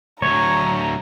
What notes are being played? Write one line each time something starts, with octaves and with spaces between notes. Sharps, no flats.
D2 F#3 C#5 A#5